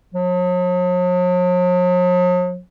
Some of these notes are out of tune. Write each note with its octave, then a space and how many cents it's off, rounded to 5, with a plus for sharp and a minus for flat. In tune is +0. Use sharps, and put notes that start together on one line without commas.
F#3 -45